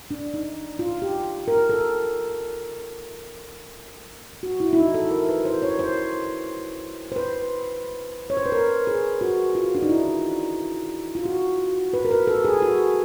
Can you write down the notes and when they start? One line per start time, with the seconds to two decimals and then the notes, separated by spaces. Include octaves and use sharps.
0.11 D4
0.34 D#4
0.79 F4
1.02 G4
1.48 A#4
1.70 A4
4.43 F#4
4.60 E4
4.73 E4
4.78 D#4
4.94 A4
5.11 A#4
5.29 B4
5.45 C5
5.62 C#5
5.79 C5
7.12 C5
7.16 B4
8.30 C#5
8.37 C5
8.46 B4
8.52 A#4
8.87 G#4
9.21 F#4
9.55 F4
9.75 D4
9.82 D#4
9.89 E4
11.15 F4
11.26 F#4
11.94 B4
12.05 A#4
12.11 B4
12.27 A4
12.45 G#4
12.62 F#4